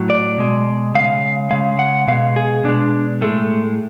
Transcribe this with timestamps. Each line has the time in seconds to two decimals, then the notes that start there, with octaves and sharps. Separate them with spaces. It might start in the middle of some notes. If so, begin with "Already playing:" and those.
Already playing: A2 F#3
0.10 D5
0.38 B2 G#3
0.95 C#3 G#3 F5
1.51 C#3 G#3 F5
1.79 F#5
2.08 B2 G#3 F5
2.36 G#4
2.64 B2 G#3 D4
3.21 A2 G#3 A3